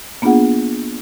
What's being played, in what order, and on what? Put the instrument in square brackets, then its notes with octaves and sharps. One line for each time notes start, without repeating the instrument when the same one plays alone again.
[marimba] A#3 B3 D4 F4 G#4 F#5